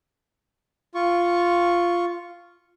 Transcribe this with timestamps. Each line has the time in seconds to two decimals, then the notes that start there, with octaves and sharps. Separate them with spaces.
0.95 F4 C#6